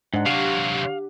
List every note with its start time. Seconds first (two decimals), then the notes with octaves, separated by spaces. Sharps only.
0.14 G#2 D4 F#5
0.26 C3 F#3 G4 F5